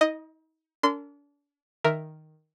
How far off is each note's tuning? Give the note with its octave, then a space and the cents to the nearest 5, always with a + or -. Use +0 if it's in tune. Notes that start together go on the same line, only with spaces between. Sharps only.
D#4 +40 D#5 +0
D4 -40 A#4 -35 C6 -25
D#3 +0 A#4 +0 E5 +0